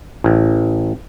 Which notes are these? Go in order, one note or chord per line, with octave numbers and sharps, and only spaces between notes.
A1